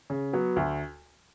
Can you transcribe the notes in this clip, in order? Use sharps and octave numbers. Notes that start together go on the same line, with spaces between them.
C#3
F#3 B3
D2